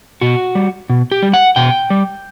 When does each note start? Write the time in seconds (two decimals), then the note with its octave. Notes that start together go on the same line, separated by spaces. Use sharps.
0.21 B2 F#4
0.55 G3
0.90 B2
1.12 G4
1.22 G3
1.34 F#5
1.56 B2 G5
1.90 G3